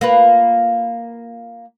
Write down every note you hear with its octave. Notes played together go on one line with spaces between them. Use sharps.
A#3 F4 B4